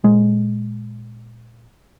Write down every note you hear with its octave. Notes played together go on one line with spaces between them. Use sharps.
A#2 G#3